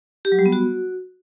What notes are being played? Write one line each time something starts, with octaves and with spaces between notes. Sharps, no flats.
G4
F#3
G3
B3
F#4